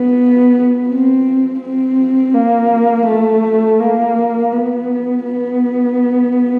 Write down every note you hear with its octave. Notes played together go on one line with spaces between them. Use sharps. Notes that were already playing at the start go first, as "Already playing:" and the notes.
Already playing: B3
C4
C4
A#3
A3
A#3
B3
B3